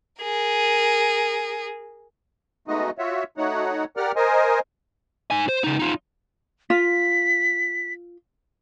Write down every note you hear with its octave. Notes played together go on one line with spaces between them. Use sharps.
G#4 A#4
G#3 A3 B3 D#4 F#4 D#5
F4 F#4 C#5 E5
A3 D#4 F#4 C#5 F#5
G4 A#4 D5 F#5 F6
A#4 C5 D#5 G#5
D#4 G#5
C5
C#3 D#4
D#4 F4
F4 B6